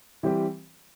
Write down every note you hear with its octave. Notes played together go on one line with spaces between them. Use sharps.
E3 G3 C4 G4